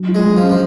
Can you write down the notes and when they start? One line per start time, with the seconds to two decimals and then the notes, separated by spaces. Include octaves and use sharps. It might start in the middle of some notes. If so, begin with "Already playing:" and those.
Already playing: F#3
0.09 F4
0.15 G#3
0.26 F#3
0.37 F3
0.42 C#4
0.49 F3